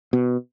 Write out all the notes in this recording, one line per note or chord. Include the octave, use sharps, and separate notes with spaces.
B2